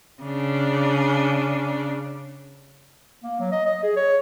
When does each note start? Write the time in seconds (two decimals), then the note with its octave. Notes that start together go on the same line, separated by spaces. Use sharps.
0.22 C#3 D4
3.24 A#3
3.40 F#3
3.52 D#5
3.66 D#5
3.83 G#4
3.96 C#5